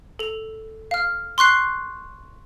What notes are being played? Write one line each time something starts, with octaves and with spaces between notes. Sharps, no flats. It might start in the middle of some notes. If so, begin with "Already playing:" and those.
A4 F7
F5 F6
C6 C#6 F#6 C7